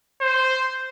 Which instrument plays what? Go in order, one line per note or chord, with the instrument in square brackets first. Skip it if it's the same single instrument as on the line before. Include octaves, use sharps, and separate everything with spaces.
[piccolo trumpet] C5